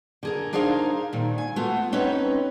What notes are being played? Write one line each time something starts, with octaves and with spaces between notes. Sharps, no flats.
D3 G#4 A#4
D4 D#4 G#4 A#4 C5 F5
A#2 D#3
G#5
A3 B3 F4 F#4
C4 C#4 D#4 B4 C#5